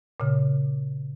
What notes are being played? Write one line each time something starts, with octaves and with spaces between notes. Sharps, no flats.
A#2 C#3